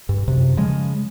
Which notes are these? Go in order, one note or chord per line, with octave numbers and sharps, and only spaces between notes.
G2
F#2 C3
C#3 F3 G#3